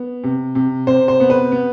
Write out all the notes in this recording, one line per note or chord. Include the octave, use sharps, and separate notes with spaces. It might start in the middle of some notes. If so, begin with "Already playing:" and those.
Already playing: B3
C3
C3
C3 C5
C5
B3
B4
B3